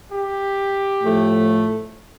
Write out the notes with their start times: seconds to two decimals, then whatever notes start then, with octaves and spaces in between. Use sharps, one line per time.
0.11 G4
1.03 A2 F3 A3